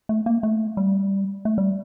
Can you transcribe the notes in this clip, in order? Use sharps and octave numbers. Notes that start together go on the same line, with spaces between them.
A3
A#3
A3
G3
A3
G3